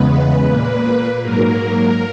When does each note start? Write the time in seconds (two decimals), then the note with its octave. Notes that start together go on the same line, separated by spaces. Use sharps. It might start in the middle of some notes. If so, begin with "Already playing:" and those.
Already playing: E2 C#3 G#3 B3 B4
0.47 A#2 A#3
1.22 G#2 F#3 A#3 A#4